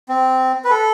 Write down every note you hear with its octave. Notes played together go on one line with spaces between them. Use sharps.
C4
B4
A4